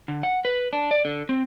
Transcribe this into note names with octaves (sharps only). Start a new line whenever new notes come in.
D3
F#5
B4
D4
D5
D3
C4